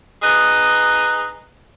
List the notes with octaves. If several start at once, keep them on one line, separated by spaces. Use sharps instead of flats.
D#4 G#4 B4